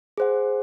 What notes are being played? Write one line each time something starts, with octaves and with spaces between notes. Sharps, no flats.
G#4 C5 F#5